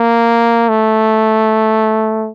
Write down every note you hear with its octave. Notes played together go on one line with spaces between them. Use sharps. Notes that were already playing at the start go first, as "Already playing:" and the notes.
Already playing: A#3
A3